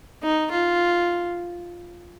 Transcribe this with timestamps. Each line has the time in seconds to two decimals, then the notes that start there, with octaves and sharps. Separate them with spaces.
0.23 D#4
0.51 F4